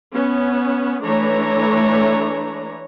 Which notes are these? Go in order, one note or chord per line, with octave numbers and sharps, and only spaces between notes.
B3 C#4
E3 A3 D4 B4 C#5 A#5